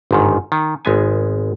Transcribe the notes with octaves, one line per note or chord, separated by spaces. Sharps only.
G1 G#2 D#3
D#3
G#1 G#3 B3 G#5